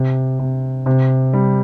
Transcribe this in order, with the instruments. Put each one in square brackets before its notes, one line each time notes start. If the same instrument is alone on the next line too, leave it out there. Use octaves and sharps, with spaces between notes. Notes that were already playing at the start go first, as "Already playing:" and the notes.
Already playing: [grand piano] C3
C3
C3
G3